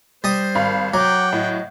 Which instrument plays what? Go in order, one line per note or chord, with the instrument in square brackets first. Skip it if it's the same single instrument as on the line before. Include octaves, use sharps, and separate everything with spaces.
[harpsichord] G3 D#6 [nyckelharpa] C5
[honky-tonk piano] G#1 F5 B5
[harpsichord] F#3 [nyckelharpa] F#5 G5 [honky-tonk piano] A#5 [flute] D6
[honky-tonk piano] A2 [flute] D#5